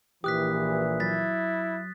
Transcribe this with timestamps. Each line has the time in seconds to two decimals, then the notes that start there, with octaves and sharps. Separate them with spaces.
0.24 A#1 A#2 E3 G4 D#6 F#6 B6
1.00 F#3 E4 A6 B6